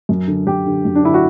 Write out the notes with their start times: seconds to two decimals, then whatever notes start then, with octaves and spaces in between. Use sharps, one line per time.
0.09 F#2
0.28 D3
0.47 F#2 G4
0.66 D3
0.85 F#2
0.95 D4
1.03 D3 E4
1.14 F#4